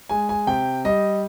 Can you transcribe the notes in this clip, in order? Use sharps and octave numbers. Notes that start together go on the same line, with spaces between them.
G#3 G#5
G#5
C3 G5
G3 D#5